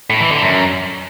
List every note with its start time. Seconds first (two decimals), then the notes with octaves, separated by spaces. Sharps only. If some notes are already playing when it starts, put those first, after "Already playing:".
0.10 A2
0.21 E3
0.31 D3
0.42 F#2